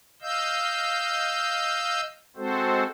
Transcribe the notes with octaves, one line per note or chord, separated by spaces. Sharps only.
D#5 F5 E6 G6
G#3 C4 F#4 A4 C5